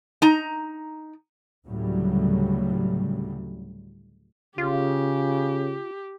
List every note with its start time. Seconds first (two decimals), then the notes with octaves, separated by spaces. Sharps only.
0.22 D#4 A#5
1.65 D2 A2 C#3 F#3 G3
4.58 C#3 F4 G4